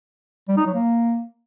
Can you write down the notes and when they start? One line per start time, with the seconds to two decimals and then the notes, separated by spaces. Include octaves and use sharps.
0.48 G3
0.57 D#4
0.66 F#3
0.75 A#3